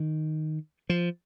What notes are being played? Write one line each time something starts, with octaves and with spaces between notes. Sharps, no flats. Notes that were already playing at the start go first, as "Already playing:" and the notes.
Already playing: D#3
F3